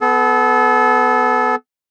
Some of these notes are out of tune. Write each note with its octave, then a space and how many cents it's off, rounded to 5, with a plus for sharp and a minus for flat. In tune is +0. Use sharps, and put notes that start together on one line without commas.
B3 +15 A4 -30